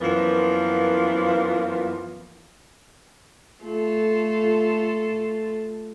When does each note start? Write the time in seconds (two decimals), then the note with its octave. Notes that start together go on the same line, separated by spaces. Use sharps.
0.01 F#2 E3 F3 A#3 B3 F4
3.63 A3 F4 A4